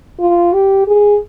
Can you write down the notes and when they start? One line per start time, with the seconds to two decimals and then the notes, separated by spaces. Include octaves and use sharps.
0.20 F4
0.53 G4
0.87 G#4